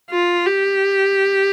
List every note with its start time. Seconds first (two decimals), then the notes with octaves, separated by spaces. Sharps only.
0.11 F4
0.46 G4